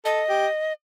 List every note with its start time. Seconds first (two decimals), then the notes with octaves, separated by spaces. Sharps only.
0.05 A4 D#5
0.29 G4